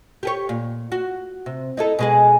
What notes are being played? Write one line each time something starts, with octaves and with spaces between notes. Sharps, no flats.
G4 G#4 C#5
A#2
F#4
C3
D#4 E4 A4
B2 G#3 G#4